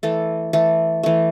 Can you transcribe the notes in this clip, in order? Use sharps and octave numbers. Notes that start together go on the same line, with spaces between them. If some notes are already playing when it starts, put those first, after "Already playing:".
E3 A3 A4
E3 A3 A4
E3 A3